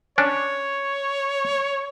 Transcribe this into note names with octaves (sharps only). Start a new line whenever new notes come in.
C#4 D4 C#5